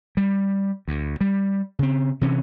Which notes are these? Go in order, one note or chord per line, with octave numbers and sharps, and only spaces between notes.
G3
D2
G3
C#3 C4
C3 E3 C#4